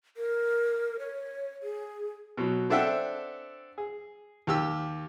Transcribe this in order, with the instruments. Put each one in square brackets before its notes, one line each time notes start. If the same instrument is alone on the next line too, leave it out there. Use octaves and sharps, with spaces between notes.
[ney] A#4
C#5
G#4
[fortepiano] B2 F#3
C4 D4 A4 E5 F#5 G5
G#4
D#2 G4 E6